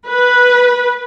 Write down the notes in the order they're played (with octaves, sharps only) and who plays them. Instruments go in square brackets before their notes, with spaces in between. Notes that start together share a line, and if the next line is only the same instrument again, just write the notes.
[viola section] B4